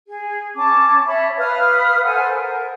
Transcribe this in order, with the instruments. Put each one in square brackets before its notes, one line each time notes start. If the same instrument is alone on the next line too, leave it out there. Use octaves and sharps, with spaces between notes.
[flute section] G#4
C#4 A5 D6
C#5 E5 A5 B5
B4 F5 D#6 F6
A4 C5 F#5 G#5
A#4